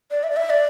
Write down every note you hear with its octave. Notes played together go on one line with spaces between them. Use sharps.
D5
E5
D5
E5
D5